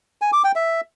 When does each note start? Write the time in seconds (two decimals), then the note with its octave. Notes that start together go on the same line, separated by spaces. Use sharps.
0.22 G#5
0.33 D6
0.44 G5
0.56 E5